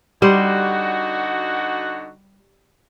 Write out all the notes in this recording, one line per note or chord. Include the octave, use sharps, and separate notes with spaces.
D3 G3 D#4 F#4 C5